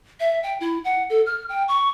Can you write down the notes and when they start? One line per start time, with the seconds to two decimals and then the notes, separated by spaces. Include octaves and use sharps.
0.20 E5
0.43 G5
0.60 E4
0.85 F#5
1.10 A4
1.26 F6
1.49 G5
1.68 C#6